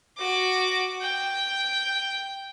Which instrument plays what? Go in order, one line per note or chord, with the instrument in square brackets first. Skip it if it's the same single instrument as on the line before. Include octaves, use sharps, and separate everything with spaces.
[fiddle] F#4 D6
G5